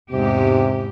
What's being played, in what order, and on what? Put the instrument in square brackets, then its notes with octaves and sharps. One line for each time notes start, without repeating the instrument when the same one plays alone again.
[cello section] E2 G#2 G4 [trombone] C3